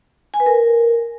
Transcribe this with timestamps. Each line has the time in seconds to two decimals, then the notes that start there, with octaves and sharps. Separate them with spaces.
0.34 G#5
0.40 B4
0.46 A#4